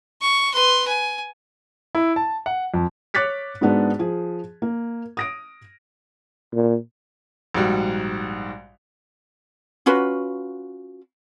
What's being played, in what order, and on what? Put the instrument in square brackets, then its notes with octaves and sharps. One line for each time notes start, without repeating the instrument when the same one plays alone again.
[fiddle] C#6
B4 C6
G#5
[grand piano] E4
A5
F#5
F2
[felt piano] C#5 D6 F#6 A6 B6 C#7
G#2 G#3 B3 D4 F#4
F3 G#4
A#3
D#6 A#6 D7
[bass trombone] A#2
[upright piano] A#1 G#2 G3 F#4
[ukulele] C#4 F4 F#4 B4